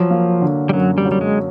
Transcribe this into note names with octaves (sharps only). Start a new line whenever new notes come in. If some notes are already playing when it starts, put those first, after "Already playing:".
Already playing: F3 F#3
A#3
D3
G3
F#2 F#3
G3
F#3
G3
G#3